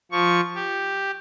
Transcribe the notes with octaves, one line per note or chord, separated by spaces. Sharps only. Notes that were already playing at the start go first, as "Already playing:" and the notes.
F3 C#6
G4